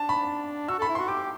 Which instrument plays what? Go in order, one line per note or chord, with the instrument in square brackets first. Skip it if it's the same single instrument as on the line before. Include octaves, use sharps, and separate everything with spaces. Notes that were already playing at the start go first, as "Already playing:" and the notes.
Already playing: [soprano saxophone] D4 [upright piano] A5
[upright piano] B5
[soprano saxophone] F#4 [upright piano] E6
[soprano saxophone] A4 [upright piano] B5
[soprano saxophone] E4
[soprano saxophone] F#4 [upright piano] C6
[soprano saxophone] G4 [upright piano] D6